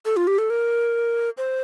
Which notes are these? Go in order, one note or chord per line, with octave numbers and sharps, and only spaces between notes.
A4
F4
G4
A4
A#4
C5